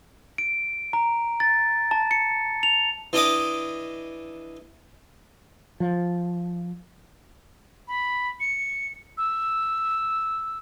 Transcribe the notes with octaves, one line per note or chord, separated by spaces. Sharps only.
D7
A#5
A6
A5
C#7
F7
E3 D4 D#5 D6
F3
B5
C#7
E6